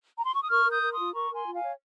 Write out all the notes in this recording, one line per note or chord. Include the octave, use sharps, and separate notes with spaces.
A#5
C6
C#6
D#6
A#4 C#6 F6
A#4
D#6 G6
A#4
C6 D#6
F4
A#4 A#5 C#6
A#4 G#5 C6
F4
F5 G#5
C#5